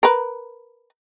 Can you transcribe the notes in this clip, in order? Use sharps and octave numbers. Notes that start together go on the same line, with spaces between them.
A#4 B4